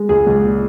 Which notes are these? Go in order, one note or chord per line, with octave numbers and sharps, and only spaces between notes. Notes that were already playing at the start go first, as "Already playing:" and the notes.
Already playing: G#3
C#2 G#4
C#2
A#2